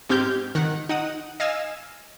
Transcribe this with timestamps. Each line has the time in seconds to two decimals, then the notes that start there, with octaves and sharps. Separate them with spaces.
0.09 G#2 C4 G4 F6 G6
0.55 D#3 F#5
0.89 D#4 F#5 D#6
1.40 D#5 F5 G#5 E6